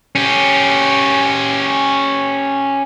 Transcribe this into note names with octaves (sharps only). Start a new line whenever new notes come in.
C#4 G4